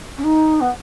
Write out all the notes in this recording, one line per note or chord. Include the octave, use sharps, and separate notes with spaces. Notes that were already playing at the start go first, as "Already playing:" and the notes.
C#4
D#4
B3